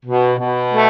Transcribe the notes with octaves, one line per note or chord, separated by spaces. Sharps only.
B2
B2
A3